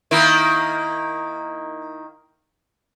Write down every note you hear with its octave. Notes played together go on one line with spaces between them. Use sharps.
D#3 A#3 E4